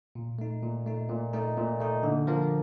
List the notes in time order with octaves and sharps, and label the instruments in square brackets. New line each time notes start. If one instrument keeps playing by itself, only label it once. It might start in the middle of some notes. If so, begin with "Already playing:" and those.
[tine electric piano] A#2
A3 D#4
A#2
A3 D#4
A#2
A3 D#4
A#2
A3 D#4
D3
F3 A#3